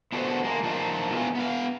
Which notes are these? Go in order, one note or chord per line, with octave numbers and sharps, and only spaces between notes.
B3 D4 F#4 A4 A#4 C5
G#3 A#3
F3 A3 A#3 D4 D#4 F4
B3 E4 F#4 G#4 F5
B3 F5